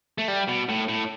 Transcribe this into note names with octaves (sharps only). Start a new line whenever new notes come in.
A3
G3
B2
A2
A2